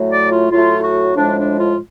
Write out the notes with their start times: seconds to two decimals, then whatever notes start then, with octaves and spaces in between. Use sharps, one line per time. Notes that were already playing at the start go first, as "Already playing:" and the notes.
Already playing: A2 F#3 A3
0.09 D5
0.30 F4
0.51 A2 F#3 A3 F4
0.83 F#4
1.15 A2 F3 G#3 D4
1.37 D4
1.58 F4